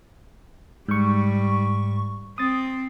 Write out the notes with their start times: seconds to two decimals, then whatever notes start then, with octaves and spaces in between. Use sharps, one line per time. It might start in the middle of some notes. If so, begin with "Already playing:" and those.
0.88 G#2 G3 C#6
2.38 C4 D#6 A6